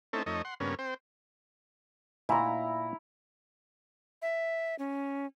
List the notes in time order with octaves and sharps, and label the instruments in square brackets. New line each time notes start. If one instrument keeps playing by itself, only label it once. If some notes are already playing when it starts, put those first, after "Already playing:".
[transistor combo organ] A3 C4 C#4 D#4 E4 A4
F2 A3 D#4 C#5 D#5
F#5 C6
G2 C#3 A#3 B3 C#4
C4 C5 G5
[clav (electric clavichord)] A#2 [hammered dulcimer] E4 A#5
[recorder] E5
C#4